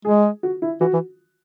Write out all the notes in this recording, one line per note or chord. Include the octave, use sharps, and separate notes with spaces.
G#3 G#4
F#4
E4
E3 F#4
E3